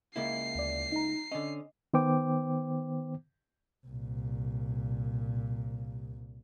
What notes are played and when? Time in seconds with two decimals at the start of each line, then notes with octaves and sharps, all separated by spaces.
0.16 C#2 A#3 E4 C7
0.55 D2 D5
0.92 D#4 A#5
1.32 D3 C#4 D#5
1.94 D#3 B3 C5 G5 D6
3.86 C2 A#2